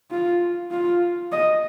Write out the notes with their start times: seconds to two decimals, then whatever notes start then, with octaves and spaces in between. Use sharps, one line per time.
0.11 F4
0.71 F4
1.32 D#5